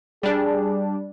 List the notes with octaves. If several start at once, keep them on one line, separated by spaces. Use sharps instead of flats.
G3 D4 G#4